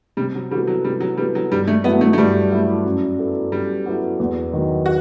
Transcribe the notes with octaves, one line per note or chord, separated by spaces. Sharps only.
C3 G3
F#3
E3 G3 B3 F#4 A4
F#3
C3 G3
F#3
E3 G3 B3 F#4 A4
F#3
G2 G3
A3
F#3 A3 B3 E4
A3
A3
G2 G3
F#3 A3 E4
F#2
F#3 B3 E4 A4
F#2 G3
F#3 B3 E4 A4
E2
D#3 F#3
F#4